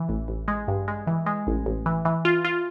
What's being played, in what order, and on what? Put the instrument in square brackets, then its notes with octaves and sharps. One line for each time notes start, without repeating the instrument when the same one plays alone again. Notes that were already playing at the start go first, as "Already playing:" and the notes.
Already playing: [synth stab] E3
A1
A1
G#3
G2
G#3
E3
G#3
A1
A1
E3
E3
F4
F4